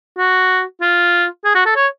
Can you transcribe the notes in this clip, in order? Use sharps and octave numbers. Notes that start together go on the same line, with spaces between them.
F#4
F4
G#4
F#4
A4
C#5